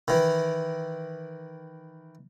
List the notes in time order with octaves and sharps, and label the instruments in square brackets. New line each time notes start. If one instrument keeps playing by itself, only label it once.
[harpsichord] D#3 E3